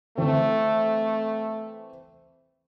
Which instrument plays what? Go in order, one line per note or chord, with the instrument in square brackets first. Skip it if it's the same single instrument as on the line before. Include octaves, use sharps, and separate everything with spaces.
[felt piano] E3 C4 [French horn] A3